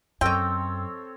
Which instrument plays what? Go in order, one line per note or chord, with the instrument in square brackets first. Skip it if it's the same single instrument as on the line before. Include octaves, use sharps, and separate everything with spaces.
[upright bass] F#2 [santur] C4 A4 C#5 [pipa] D#5 G5